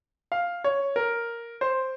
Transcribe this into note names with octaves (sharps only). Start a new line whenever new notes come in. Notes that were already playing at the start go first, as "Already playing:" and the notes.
F5
C#5
A#4
C5